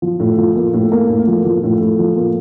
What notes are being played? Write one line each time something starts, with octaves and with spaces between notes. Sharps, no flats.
F3
A2
F3
A#3
A2
A#3
A2
F3
F3
A2
A2
F3
A#3